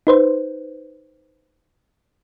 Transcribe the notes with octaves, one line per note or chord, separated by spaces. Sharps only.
D#4 B4 C5